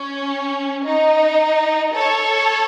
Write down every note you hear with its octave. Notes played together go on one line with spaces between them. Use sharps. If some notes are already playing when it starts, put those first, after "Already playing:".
Already playing: C#4
D#4
A4 C#5